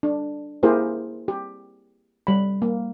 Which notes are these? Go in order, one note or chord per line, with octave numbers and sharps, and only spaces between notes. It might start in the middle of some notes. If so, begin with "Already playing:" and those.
D4
A#3 E4 G4 G#4 A#4 C5
G4
G3 B5
A#3